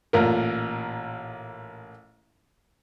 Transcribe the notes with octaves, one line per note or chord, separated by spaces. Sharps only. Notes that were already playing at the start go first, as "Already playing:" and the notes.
A1 A#2 A#4